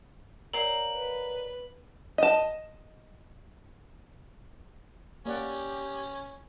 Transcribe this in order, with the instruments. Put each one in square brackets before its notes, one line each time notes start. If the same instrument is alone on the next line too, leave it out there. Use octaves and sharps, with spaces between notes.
[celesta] A#4 C#5 D5 [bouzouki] F5 G5 A#5 [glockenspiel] F#7
[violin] B4
[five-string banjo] D#5 A5
[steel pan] A#3 D5 F#5 [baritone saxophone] C#4 [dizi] G4